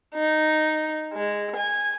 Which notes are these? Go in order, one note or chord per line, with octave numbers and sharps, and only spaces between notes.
D#4
G#3
G#5